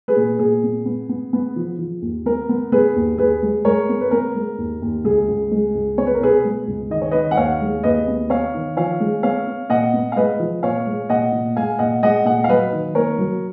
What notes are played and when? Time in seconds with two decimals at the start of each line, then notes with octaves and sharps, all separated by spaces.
0.08 G#4 B4
0.16 A#2
0.39 A#2 G#4
0.63 B3
0.86 B3
1.09 B3
1.33 B3
1.56 F3
1.79 F3
2.02 D#2
2.26 B3 A#4
2.49 B3
2.72 B3 G#4 B4
2.96 D#2
3.18 D#2 G#4 B4
3.43 G#3
3.65 G#3 A#4 C#5
3.89 B3
4.01 B4
4.11 B3 A#4
4.35 G#3
4.58 D#2
4.82 D#2
5.04 C#2 G#4
5.28 C#2
5.51 G#3
5.75 C#2
5.98 B3 C#5
6.07 B4
6.15 A#4
6.21 B2 G#4 B4
6.45 G#3
6.67 C#2
6.90 D#3 D#5
7.02 C#5
7.11 D#3 B4 D#5
7.31 F#5
7.37 D#2 C#5 F5
7.61 G#3
7.83 D#2 B4 D#5
8.08 B3
8.30 B3 C#5 F5
8.54 D#3
8.77 F3 C#5 F5
9.00 G#3
9.23 B3 C#5 F5
9.47 B3
9.69 A#2 D#5 F#5
9.94 B3
10.12 F5
10.16 G#3 B4 D#5
10.39 F3
10.63 A#2 C#5 F5
10.86 G#3
11.09 A#2 D#5 F#5
11.32 A#2
11.56 G#3 F5 G#5
11.79 A#2 D#5 F#5
12.03 G#3 D#5 F#5
12.25 A#2 D#5 F#5
12.44 F5
12.49 F#3 B4 D#5
12.72 D#3
12.95 A#3 A#4 C#5
13.18 F#3